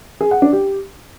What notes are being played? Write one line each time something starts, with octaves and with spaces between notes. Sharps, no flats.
G#4
F#5
D4
G4